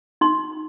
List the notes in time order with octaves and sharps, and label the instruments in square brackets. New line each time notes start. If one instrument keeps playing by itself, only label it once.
[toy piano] D#4 C6